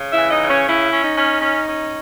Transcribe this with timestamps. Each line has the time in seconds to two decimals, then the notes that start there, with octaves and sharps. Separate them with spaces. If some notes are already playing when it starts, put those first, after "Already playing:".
Already playing: C#3
0.11 E4 E5
0.18 E3
0.30 D#4 D#5
0.42 C#3
0.48 C#4 C#5
0.67 C#4 E4
0.92 C#4
1.05 D#4
1.17 C#4
1.41 C#4
1.66 C#4